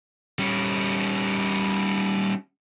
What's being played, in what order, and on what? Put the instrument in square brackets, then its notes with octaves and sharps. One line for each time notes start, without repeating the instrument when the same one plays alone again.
[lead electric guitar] G3 C#4